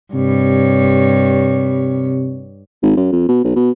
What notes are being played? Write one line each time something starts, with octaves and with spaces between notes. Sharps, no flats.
G2 C3 C#5
G#1
F#2
F2
B2
B1
B2